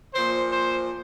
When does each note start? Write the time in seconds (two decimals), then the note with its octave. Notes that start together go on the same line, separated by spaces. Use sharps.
0.14 A#2 F3 C5
0.52 C5